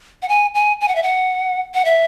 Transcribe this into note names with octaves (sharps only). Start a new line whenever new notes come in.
F#5
G#5
G#5
G#5
F#5
E5
F#5
F#5
E5